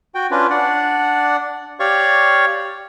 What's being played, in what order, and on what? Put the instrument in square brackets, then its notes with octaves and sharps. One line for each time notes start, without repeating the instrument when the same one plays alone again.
[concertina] F#4 G5
C#4 D4 F4 B4
D4 D5 F#5
G4 C#5 D5 F5 C#6